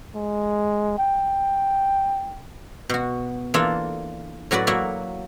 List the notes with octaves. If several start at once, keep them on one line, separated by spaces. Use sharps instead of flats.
G#3
G5
B2 F#4
E3 A#3 D4 F4 A4 E5
A2 F#3 F#4 B4 D5
F#3 A#3 E4 F#4